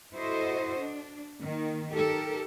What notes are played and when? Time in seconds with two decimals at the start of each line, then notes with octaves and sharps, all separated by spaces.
0.13 E4 F#4 A4 C5 D#5
0.79 D4
1.42 D#3 A#3
1.90 D#4 G4 A4 A#4